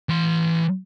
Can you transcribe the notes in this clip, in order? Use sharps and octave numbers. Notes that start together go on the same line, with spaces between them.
E3 C6